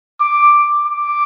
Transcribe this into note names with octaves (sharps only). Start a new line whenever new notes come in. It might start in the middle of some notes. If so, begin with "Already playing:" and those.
D6
D6